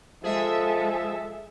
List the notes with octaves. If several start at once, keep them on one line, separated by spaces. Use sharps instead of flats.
F3 G#3 G#4 A4 E5